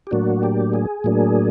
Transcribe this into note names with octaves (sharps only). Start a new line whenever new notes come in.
G4
A2 F#3 A#3 D4 F#4
G4
G#4
A2 F#3 A#3 D4